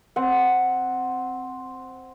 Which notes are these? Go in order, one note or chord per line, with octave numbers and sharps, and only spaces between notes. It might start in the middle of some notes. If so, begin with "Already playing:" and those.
C4 F#5